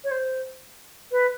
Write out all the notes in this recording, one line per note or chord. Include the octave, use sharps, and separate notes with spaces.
C#5
C5
B4